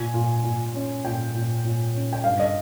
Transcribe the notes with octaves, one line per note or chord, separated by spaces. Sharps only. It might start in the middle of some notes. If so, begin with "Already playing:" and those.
Already playing: A#2 G#5
A#2
A#2
C#4
A#2 G5
A#2
A#2
C#4
G5
G2 F5
D#5